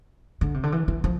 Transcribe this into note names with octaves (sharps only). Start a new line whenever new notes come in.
D3
C3
D3
E3
E3
F3